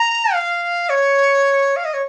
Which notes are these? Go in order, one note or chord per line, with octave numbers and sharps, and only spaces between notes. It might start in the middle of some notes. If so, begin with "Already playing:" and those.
Already playing: A#5
F5
C#5
F5
D#5
C#5